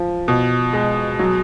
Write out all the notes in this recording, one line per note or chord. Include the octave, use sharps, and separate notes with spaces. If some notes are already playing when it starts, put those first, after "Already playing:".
Already playing: F3
B2
G#3
F#3